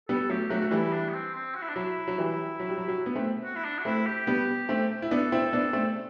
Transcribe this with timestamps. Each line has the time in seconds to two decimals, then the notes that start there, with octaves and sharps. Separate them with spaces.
0.09 G3 B3 A4
0.29 F#3 A3 G4
0.50 F#3 A3 F#4
0.62 A3 F#4
0.71 E3 G3 E4
0.93 D4
1.09 B3
1.13 C4
1.34 C4
1.55 F#4
1.62 E4
1.69 D4
1.76 F#3 E4
2.08 F#3
2.18 E3 G3
2.59 F#3
2.69 G3
2.77 F#3
2.88 F#3
3.06 B3
3.16 A3 C4
3.44 F#4
3.56 E4
3.65 D4
3.79 F#4
3.85 A3 C4 E4
4.06 G4
4.27 G3 B3
4.69 A3 C4
5.02 E4
5.11 B3 D4 A4
5.32 C4 E4
5.53 B3 D4
5.73 A3 C4